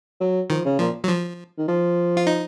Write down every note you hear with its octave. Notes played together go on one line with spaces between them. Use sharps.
F#3
D#3 F3
C#3
A#2 F3
F#3
F3
D#3
F3
F4
D#4